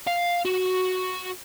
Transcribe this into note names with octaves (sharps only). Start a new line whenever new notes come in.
F5
F#4